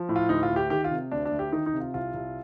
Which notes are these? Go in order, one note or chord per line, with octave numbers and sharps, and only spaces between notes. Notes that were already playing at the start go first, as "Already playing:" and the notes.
Already playing: F3
A2
F4
D2 D#4
F4
D2
G4
D#3 G4
F4
C3
D2 D4
D4
D2
G4
D#3 D#4
D#4
C3
F4
C2 F4
C2